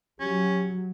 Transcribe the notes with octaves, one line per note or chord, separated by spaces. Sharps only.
F#3 C#4 G4